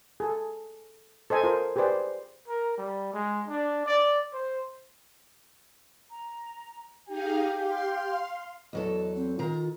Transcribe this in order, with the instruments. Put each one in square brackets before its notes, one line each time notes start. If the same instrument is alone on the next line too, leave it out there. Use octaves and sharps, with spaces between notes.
[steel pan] G#4 A4
A4 C5 D#5 G#5
F4 A#4 C5
G4 G#4 B4 C5 D5
[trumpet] A#4
G3
G#3
D4
D5
C5
[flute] A#5
[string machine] D#4 G#4 F5 [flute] G4 [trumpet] G5
[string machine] F5 C6
[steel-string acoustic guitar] E2 F#3 A4 [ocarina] D#5
[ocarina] C4
[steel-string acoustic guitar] D#3 A#5 [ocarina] F4